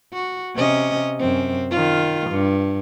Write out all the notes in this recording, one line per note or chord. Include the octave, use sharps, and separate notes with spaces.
F#4
C3 C#4 D#5
F#2 C4
D#3 F4
G2